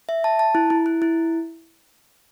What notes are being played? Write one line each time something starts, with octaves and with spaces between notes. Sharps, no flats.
E5
A5
A5
E4
E4
E4
E4